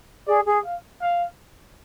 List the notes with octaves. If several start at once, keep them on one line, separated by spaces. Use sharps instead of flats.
G#4 D5
G#4
F5
F5